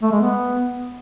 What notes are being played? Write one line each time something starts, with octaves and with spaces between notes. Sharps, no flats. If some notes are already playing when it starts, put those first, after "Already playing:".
A3
G#3
B3